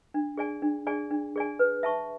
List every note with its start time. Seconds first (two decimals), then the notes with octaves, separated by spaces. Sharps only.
0.14 D4
0.38 G#4 D5 G#5
0.62 D4
0.87 G#4 D5 G#5
1.11 D4
1.36 G#4 D5 G#5
1.59 B4
1.83 E5 A5 C#6